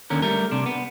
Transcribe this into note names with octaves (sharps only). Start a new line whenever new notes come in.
D#2 D3 C#4 A#4
G3 A3 A#4
C3 D4
B3